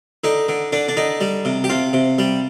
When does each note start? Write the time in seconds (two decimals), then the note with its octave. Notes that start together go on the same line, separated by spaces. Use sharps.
0.24 D3 D#4
0.48 D3
0.72 D3 D4
0.88 D4
0.97 D3 D#4
1.21 G3
1.45 C3
1.64 G4
1.69 C3 F4
1.93 C3
2.19 G3